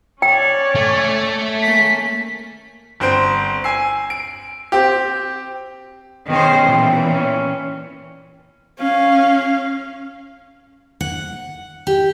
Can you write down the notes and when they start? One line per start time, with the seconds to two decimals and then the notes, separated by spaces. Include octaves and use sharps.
0.22 C#4 C#5 D5 G5
0.75 A3
1.62 A#3 C#4 B6
3.00 G1 C4 C5 D7
3.64 G#5 E6 C7
4.10 D7
4.72 C4 G4
6.29 B2 D#3 C#4 G#4 C5 G5
6.66 A#2 E3
7.14 C#4
8.78 C#4 F5
11.01 F#5
11.87 G4